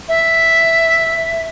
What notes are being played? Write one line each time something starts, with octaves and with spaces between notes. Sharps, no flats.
E5